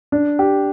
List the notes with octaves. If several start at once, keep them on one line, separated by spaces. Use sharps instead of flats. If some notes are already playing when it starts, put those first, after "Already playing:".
D4
G4